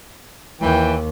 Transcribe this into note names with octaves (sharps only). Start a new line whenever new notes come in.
D#2 E3 G5